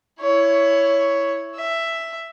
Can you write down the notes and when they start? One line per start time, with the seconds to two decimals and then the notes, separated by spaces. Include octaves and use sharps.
0.21 E4 C#5
1.56 E5